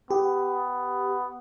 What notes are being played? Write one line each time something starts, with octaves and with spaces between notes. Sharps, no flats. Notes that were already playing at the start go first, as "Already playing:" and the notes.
B3 G4